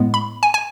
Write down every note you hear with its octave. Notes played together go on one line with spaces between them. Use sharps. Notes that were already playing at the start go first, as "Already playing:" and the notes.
Already playing: A2 G#3 B3
B5
G#5
G#5